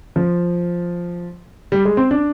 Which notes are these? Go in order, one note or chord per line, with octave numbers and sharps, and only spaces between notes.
F3
G3
G#3
C4
D4